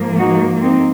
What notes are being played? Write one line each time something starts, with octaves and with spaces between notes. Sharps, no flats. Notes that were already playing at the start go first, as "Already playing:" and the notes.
Already playing: G#2 F3 A#3
D#4 F#4
C4 D#4